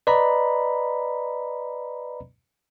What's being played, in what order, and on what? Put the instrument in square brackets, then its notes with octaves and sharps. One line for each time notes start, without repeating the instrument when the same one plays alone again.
[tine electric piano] B4 D5 D#5 A#5 B5